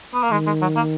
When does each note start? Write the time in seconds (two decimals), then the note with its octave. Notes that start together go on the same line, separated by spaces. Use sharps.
0.14 B3
0.23 A#3
0.31 D#3 G#3
0.47 G#3
0.62 F#3
0.76 A#3